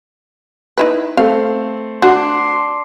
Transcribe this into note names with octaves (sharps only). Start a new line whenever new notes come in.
D#4 E4 B4
A3 C4 F5
D4 F#4 C6